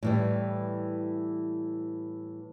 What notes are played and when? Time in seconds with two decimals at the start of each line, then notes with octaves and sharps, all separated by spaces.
0.03 A2 E3 G3